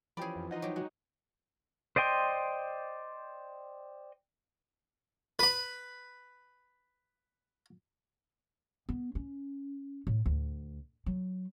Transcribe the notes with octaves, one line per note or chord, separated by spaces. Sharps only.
E3 F3 C#4 G4 G#4 D5 B5
F2
D#4 F4 D#5 F#5
F#3 G4
G#3 F#4
C5 D5 D#5 G5 C6
B4 B5
B3
C#4
A2
D2
F#3